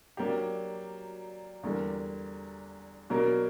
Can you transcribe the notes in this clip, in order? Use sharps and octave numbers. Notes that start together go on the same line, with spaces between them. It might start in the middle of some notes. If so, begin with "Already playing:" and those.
F#3 A#3 D4 G4
E2 D3 G3 A#3
B2 F#3 A#3 D4 A#4